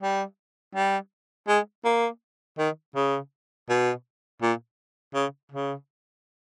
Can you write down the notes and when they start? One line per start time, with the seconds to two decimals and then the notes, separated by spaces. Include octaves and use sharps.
0.01 G3
0.75 G3
1.48 G#3
1.85 A#3
2.58 D#3
2.95 C#3
3.69 B2
4.42 A#2
5.15 C#3
5.52 C#3